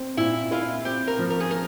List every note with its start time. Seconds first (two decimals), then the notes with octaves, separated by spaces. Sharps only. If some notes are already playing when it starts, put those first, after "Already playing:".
Already playing: C4
0.17 A#2 E4
0.51 E4 F4
0.85 C4 G4
1.07 A#4
1.19 F3
1.30 A#4
1.40 G#4
1.51 A#4